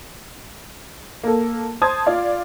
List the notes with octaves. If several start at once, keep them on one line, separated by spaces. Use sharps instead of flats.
A#3 A4
C5 A5 C6 D#6 G#6
F4 D5 F5